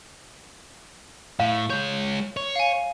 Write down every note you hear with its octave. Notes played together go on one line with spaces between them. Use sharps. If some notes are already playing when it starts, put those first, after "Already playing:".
A2 F5
G#3 C#5 G6
C#5
F5 G#5